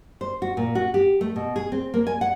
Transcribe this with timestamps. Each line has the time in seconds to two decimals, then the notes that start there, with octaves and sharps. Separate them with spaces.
0.21 C5
0.42 F#4
0.57 A#2
0.75 F#4
0.94 G4
1.21 A3
1.36 B2
1.56 G#4
1.72 C4
1.94 A#3
2.07 G#5
2.21 F#5